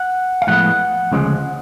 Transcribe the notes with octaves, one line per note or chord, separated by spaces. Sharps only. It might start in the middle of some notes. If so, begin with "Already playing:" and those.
Already playing: F#5
F5
A2 F3 G#3 B3 F#5
D2 C#3 F3 G#3